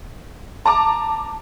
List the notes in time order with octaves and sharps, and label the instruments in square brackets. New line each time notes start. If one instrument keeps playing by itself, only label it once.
[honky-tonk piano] A5 A#5 D6